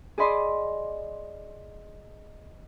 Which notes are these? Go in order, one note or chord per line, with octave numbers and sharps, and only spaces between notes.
G#4 D5 D#5 B5 C6 D6